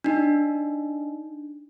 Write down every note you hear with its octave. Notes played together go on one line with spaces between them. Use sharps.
D4 D#4